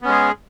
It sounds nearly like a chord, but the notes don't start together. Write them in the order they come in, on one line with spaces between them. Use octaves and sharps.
B3 C#4 G#3 G#4